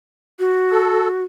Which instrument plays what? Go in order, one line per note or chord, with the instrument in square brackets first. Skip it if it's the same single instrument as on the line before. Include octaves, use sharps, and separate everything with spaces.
[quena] F#4
[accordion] A4